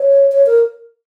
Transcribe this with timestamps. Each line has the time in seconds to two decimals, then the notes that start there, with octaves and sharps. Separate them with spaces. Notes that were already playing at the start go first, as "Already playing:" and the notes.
Already playing: C#5
0.32 C#5
0.46 A#4